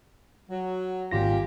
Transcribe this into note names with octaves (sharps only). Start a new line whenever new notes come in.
F#3
G#1 A#2 G3 F4 G4 A#6